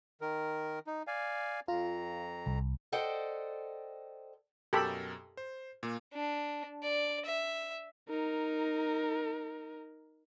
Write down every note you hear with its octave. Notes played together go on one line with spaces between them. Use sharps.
D#3 A#4
D#4
D5 F5 G#5
F2 F4 A#5
C2
A4 C5 D5 D#5 F#5 G5
F#2 B2 G4 A4 A#4 B5
C5
A#2 A#3
D4
D5
E5
D#4 A#4